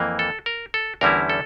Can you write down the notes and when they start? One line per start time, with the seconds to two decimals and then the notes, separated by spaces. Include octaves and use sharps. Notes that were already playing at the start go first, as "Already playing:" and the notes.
Already playing: F2 E3 A#3
0.19 A4
0.46 A#4
0.74 A4
1.01 E2 D3 G3 C#4 E4 A#4
1.29 A4